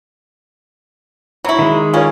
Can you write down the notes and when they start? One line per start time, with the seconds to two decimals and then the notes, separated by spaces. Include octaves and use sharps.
1.44 F#3 E4 A#5 C#6
1.59 D#3 G#3
1.94 C#4 F4 A#4 C#5